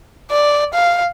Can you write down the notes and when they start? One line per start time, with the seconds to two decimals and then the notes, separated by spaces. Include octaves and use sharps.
0.31 D5
0.75 F5